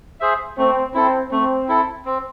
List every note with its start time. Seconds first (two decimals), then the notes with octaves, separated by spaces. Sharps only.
0.21 G#4 C5 E5
0.58 A3 C4
0.94 C4 E4 A4
1.31 A3 C4
1.69 E4 A4
2.05 C4